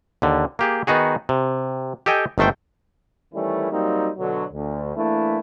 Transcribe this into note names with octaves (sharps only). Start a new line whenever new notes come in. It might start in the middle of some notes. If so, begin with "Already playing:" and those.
D#2 D3
A#3 G4 G#4
D#3 B3 D#4 F#4 G#4
C3
G4 A4 D#5 G5 G#5
G1 D#3 A3 C5 G5
D#3 E3 G3 A3 C#4 E4
F#3 G3 A#3 C4 D#4
B2 D3 F#3
D2
E3 A3 A#3 D4 E4